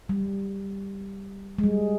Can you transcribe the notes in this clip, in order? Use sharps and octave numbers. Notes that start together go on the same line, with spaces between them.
G3
G#3
G3